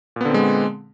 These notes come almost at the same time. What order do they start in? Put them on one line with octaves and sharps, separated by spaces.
A#2 B3 D3 C4 G#3